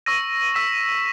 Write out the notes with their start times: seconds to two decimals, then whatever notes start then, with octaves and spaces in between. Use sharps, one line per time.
0.06 C#6 E6 A#6 D#7
0.54 E6 B6 E7